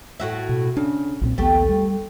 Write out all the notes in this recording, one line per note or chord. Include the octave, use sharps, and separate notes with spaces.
A2 F#4 E5
B2
C#3 D4
B1 A#2 C4
A#1 D#2 A3 B3 G4
G3